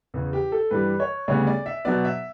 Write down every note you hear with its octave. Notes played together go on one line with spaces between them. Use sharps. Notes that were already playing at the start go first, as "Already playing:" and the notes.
E2 C#3 E3
G4
A4
G2 E3 G3 B4
C#5
D2 C#3 G3 B3 C#5
D5
E5
B2 F#3 B3 D5
E5